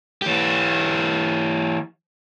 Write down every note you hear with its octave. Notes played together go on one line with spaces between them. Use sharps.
E3 G4